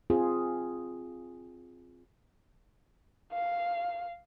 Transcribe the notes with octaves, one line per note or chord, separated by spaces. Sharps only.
C4 F4 G#4
F5